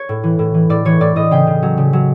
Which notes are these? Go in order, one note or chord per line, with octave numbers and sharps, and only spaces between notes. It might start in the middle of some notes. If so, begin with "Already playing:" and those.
Already playing: C#5
A2
E3
A2
E3
A2 D5
E3 C#5
A2 D5
A2 D#5
C#3 G5
C#3
F#3
C#3
F#3